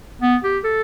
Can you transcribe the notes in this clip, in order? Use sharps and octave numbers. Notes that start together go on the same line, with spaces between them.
B3
G4
A4